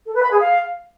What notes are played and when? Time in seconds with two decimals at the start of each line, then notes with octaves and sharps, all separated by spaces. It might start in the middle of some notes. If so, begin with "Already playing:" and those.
0.06 A4
0.14 B4
0.23 B5
0.31 G#4
0.40 F5